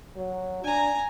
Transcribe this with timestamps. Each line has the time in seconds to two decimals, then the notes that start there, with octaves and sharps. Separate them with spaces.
0.16 F#3
0.64 D4 G#5 A#5